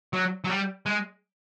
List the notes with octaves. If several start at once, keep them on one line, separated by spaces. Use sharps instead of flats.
F#3
F#3
G3
G#3